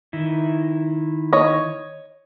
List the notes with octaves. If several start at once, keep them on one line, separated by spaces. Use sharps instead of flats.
D#3 E4
C#5 D#5